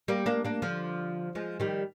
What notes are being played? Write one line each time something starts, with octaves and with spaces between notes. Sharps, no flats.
G3 A#3
A#3 D4
A#3 D4
D3 F3
F3 G#3
D#3 G3